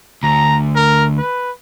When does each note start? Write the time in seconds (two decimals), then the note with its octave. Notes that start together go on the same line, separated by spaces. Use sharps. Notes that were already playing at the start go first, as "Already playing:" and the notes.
0.23 D2 A#5
0.75 A#4
1.18 B4